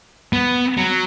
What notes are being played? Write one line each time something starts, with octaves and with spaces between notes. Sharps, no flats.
B3
F#3